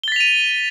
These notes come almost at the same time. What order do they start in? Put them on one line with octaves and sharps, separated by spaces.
G7 A6 B6 F7 D#7